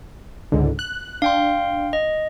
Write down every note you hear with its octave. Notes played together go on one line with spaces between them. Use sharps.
C#2 G#2 D3
F#6
D4 F5 G5 C6
D#5